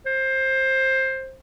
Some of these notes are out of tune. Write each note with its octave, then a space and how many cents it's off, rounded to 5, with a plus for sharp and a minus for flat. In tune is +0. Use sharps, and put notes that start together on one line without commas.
C5 +15